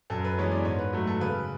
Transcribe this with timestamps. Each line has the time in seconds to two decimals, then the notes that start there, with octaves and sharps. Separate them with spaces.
0.10 F#2 A4
0.25 B4
0.38 E3 G#3 B3 C#5
0.51 D5
0.65 G#2 C#5
0.79 B4
0.93 F#3 A3
1.07 A4
1.20 C#3 B4